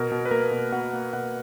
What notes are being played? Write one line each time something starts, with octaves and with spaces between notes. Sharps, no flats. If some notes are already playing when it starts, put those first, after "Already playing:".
Already playing: B2 A#4
B2
B4
A#3 A#4
B2
B2 F#5
A#3
B2 F#5